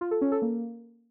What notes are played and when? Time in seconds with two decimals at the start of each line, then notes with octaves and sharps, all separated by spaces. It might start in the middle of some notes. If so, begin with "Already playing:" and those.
0.01 F4
0.11 A4
0.21 C#4
0.32 A4
0.42 A#3